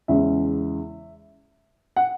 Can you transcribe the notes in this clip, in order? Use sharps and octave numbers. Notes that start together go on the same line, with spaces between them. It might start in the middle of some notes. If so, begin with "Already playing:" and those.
E2 C#3 G#3 C#4 E5
F#5